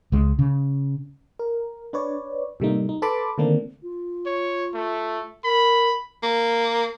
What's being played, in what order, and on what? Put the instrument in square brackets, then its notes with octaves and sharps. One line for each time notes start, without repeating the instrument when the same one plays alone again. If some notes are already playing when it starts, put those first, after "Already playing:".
[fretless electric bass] C#2 G#3
C#3
[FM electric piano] A#4
D4 B4 C#5 D5
A2 C3 G3 A3 A#3 D#4
D#4
A4 B4 A5 B5 C6 D6
D3 D#3 A3 A#3 C4 D4
[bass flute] F4
[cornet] C#5
A3
[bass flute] A#4 [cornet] B5
[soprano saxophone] A#3